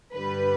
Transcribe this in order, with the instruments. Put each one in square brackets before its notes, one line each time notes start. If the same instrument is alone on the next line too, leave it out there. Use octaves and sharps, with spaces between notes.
[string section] G2 D3 G3 B4